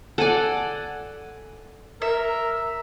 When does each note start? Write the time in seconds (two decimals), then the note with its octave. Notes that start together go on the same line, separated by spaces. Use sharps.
0.18 A4 D5 F#5 G#5
2.02 A#4 E5